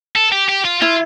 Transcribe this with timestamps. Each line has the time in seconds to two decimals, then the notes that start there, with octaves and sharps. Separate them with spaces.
0.15 A4
0.32 G4
0.49 G4
0.64 F4
0.81 E4 F4